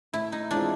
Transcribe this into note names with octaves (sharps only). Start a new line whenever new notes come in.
A2 E4
D#4
E3 G#3 C4 D4 F4